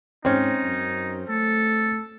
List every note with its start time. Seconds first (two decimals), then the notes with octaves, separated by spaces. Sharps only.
0.25 G#2 C4 C#4 D#4
0.63 F#2
1.29 A3 A4